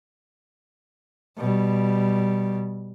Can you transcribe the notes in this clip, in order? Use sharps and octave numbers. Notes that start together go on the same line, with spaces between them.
B2 G3